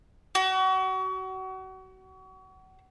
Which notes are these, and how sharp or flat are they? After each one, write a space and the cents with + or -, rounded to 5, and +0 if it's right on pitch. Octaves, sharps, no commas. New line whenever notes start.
F#4 +30